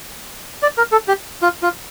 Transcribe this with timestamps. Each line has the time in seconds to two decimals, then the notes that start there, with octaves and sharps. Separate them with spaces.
0.63 D5
0.78 A#4
0.92 A4
1.08 G4
1.42 F4
1.63 F4